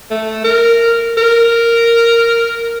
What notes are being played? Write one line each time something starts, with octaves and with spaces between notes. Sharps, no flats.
A3
A#4
A#4